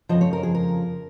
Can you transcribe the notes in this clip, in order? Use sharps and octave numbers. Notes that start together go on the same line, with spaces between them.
F2 C#3 F3 D#5
C#5
A#4
G#4
A#4